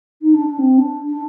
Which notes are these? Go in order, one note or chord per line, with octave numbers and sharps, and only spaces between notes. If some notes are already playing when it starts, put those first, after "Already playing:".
D#4
D4
D4
C4
D4
D4